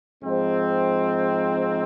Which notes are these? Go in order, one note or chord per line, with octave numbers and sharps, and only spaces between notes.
G#2 F3 C4